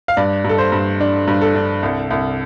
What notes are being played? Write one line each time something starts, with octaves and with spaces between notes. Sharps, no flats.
F5
G2 D5
G2 A4
C5
G2
D4
G2
A4
D4
C2
C2